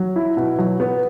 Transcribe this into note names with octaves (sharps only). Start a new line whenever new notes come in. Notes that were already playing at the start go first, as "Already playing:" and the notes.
Already playing: F#3
E4
B2
F#3
B3